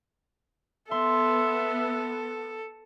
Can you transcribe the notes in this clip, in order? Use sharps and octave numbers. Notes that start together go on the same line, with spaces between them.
B3 A4 E5 C6